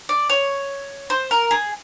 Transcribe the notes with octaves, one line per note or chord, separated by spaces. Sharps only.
D5
C#5
C5
A#4
G#4